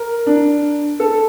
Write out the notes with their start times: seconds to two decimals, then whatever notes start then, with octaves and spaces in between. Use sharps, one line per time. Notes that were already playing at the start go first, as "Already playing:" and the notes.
Already playing: A#4
0.26 D4
1.00 A4